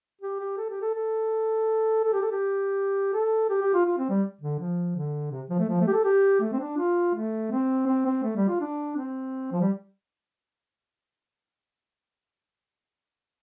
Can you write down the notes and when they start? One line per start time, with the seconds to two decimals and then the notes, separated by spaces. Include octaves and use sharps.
0.21 G4
0.40 G4
0.58 A4
0.70 G4
0.82 A4
0.95 A4
2.04 A4
2.13 G4
2.22 A4
2.32 G4
3.14 A4
3.50 G4
3.62 G4
3.74 F4
3.86 F4
3.98 C4
4.10 G3
4.41 D3
4.59 F3
4.96 D3
5.31 C3
5.49 F3
5.59 A3
5.69 F3
5.81 A3
5.88 G4
5.93 A4
6.05 G4
6.41 A3
6.53 C4
6.60 D4
6.78 F4
7.15 A3
7.51 C4
7.87 C4
8.06 C4
8.23 A3
8.36 G3
8.48 F4
8.61 D4
8.96 C4
9.52 F3
9.61 G3